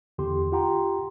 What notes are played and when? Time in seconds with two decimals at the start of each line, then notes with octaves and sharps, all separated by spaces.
0.18 E2 D3 G4 C6
0.52 F4 G4 F#5 G5 A#5 C6